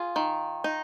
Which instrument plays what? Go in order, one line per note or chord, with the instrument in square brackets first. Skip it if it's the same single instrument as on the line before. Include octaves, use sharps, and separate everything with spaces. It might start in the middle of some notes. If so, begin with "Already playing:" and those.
Already playing: [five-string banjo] F4 G#4
D#3
D#4